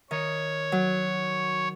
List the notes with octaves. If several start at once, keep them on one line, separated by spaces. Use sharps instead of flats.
D#3 C#5
F#3